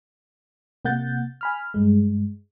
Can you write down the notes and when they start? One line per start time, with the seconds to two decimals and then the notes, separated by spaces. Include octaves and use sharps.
0.85 C3 A#3 F#5 G6 A6
1.41 G#5 B5 F6
1.74 G2 G#3